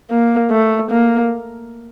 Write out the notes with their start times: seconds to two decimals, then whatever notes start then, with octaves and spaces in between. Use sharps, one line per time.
0.11 A#3
0.51 A3
0.91 A#3